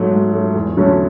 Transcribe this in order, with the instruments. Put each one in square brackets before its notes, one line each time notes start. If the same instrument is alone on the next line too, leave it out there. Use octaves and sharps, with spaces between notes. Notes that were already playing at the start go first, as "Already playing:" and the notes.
Already playing: [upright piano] G#2 F#3 A3
G#2
F#3 A3
E2
D3 F#3 A3 C#4